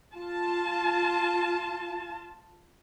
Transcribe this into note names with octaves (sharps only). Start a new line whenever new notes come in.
F4 A5